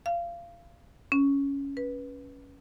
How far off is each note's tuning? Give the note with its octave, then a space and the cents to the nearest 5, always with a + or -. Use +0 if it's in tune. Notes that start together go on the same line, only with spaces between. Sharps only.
F5 -25
C#4 +5
B4 -15